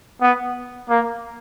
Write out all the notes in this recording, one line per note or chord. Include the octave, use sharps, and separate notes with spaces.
B3
A#3